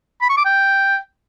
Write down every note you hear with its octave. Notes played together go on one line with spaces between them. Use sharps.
B5
C#6
D6
G5